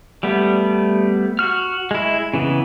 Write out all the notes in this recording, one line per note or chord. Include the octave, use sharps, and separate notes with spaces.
G3 A3 B3
F#4 F6
G#3 E4
C#3 E3 B3